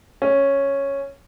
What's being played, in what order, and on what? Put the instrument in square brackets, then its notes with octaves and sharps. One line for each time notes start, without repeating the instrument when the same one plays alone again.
[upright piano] C#4